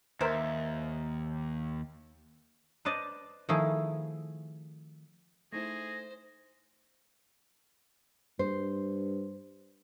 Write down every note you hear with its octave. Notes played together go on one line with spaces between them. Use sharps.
D#2 A#4 C5 E5
B4 C5 D5 D#5 A5
D#3 F3 A3 E4 G#4
A3 D#4 E4 G#4 C5 A#6
G2 C5